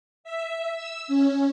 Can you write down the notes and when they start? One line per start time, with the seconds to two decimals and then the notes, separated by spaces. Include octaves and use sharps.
0.24 E5
0.74 E6
1.08 C#4